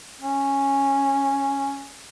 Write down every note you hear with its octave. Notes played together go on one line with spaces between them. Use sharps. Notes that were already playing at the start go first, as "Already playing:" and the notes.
C#4